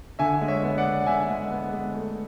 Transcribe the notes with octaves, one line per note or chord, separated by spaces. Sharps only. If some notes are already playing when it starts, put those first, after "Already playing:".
D3 E5 G#5
G#3
C#5 E5
B3
D5 F#5
B3
D3 E5 G#5
G#3
B3
G#3
A3